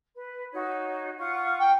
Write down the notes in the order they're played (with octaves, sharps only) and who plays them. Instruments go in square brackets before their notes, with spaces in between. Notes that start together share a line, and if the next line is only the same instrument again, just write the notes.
[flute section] B4
D#4 F#4 C#5
F4 F#5 C#6
[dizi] G5